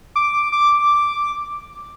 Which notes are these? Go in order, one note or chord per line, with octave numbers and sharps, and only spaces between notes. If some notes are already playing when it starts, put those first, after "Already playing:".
D6
D6